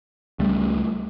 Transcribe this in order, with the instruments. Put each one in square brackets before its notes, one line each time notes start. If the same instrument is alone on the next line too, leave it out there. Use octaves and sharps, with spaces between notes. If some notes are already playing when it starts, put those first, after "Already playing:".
[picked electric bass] C#2 G3 A3